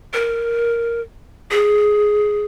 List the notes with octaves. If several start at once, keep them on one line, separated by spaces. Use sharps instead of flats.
A#4
G#4